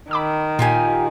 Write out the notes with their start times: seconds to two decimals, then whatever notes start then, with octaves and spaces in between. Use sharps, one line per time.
0.11 D#3 B5 D6 E6
0.59 A#2 F4 G4 G#5